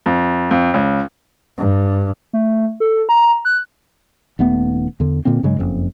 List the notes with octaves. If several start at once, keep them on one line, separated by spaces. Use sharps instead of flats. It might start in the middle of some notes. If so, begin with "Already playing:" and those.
F2
F2
C#2
G2
A3
A4
A#5
F#6
D#1 D#2 A3 B3
E2 D3
A#2 D3 A#3 C4
G2 C#3 F#3 G#3
F#1 F2